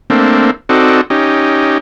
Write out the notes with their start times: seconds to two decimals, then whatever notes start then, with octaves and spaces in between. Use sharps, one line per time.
0.10 A3 A#3 C4 D4
0.69 C4 D#4 F#4 A4 D5
1.10 C#4 D#4 G4